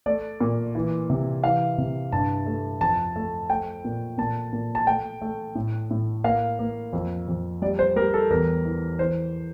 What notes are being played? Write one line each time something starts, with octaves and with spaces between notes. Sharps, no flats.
A3 D5
A#2
E3
C3
E3 F5
C3
G2 A5
A3
F2 A5
A3
A3 G5
A#2
A#2 A5
A#2
A5
A3 G5
A3
A2
A2
A#3 F5
A#3
F2
F2
G3 D5
C5
G3 A#4
A4
E2 A#4
E3
E3 C5